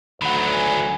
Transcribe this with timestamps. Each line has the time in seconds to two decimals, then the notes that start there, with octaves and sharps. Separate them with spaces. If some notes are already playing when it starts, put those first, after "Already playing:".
0.22 D2 D#3 F#3 F#5 B5
0.52 G#5